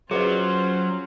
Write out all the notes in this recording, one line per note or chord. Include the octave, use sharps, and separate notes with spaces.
F#3 C#4 F4 G#4 B4 C5 D#5